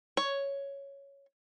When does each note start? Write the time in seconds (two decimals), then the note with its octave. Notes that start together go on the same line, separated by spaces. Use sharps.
0.17 C#5